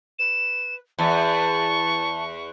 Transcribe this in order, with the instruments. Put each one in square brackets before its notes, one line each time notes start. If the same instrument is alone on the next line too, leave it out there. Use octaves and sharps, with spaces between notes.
[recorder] B4 [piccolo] E7
[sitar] E2 [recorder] A5 [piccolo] C#6